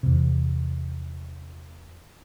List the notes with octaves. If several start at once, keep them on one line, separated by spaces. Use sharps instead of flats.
E2 C3